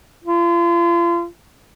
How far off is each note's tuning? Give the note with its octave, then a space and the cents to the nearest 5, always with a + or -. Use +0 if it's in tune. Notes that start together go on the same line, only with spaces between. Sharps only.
F4 -35